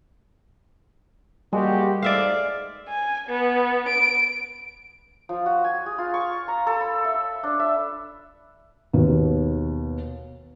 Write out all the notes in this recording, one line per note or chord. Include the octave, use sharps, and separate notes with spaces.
G3 G#3 A#3 F#4 G4
G#2 D5 E5 F5
G#5
B3
D7
F3
F#4
G#5
G#4
F4
C#6
A#5
A4
B5
E5
D4
E5
D#2 B2